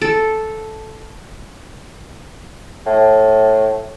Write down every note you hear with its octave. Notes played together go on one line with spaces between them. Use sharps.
A4
A2